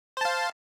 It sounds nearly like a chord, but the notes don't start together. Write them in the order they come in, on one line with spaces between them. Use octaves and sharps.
C5 A5 F5